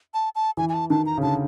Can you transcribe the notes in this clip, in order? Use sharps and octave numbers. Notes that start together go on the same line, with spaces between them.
A5
A5
E3 G#5
G#5
A5
D#3 A5
A#5
C#3
D3 A5